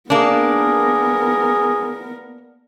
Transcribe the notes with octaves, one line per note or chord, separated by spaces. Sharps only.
A#3 B3 D4 G#4 A#4